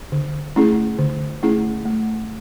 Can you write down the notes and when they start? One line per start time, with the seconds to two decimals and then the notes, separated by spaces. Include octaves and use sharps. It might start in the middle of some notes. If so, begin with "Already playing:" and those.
0.12 D3
0.56 A3 C#4 E4 G#4
0.99 D3
1.43 A3 C#4 E4 G#4
1.85 A3